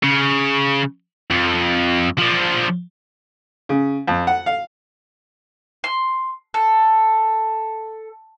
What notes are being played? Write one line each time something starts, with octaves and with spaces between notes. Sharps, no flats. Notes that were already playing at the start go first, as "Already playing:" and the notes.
C#3
F2
F3 D4
C#3
F2
F#5
F5
C6
A4